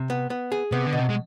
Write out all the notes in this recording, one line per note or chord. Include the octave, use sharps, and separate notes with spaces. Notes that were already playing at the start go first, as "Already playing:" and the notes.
Already playing: C3
B3
B3
G#4
C3 B3
D3
B2
C3
G#3